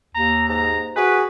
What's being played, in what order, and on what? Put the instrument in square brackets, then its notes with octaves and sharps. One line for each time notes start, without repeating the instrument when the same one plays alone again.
[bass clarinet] D#2 [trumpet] A#5
[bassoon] G#2 [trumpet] A#5
[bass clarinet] F#4 [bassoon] G#4 [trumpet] B4